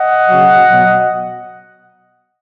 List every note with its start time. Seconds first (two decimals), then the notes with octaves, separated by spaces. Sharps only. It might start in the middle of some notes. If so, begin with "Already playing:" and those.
Already playing: D#5 F#5
0.29 C#3 F#3
0.68 B2 F#3